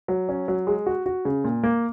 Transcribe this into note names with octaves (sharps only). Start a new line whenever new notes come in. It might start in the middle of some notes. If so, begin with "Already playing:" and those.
F#3
C#4
F#3
G#3
F#4
F#4
C#3
A#2
A#3